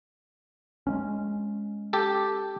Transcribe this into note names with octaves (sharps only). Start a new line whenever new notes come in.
G#3 A#3 C#4
G4 A4